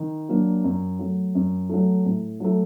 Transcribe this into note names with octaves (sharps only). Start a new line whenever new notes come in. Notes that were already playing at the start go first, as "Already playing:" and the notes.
Already playing: D#3
F#3 A#3 D4
F#2
F#3 A3
F#2
F#3 A3
A2
F#3 A3